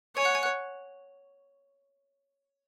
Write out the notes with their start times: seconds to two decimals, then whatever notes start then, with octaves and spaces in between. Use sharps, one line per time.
0.17 C#5 G#5 G#6
0.25 F#5 F#6
0.35 G#5 G#6
0.43 F#5 F#6